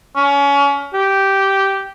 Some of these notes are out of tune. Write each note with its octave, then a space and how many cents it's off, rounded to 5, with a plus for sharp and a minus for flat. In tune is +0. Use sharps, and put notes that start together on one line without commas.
C#4 +30
G4 -10